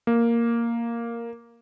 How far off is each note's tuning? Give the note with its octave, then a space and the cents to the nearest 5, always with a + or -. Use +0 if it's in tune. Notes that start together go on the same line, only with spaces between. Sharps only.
A#3 +0